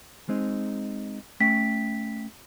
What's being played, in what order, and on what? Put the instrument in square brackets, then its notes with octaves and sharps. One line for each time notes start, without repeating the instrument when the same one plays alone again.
[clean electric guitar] G#3 C4 D#4
[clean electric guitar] A3 C#4 G5 [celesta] B6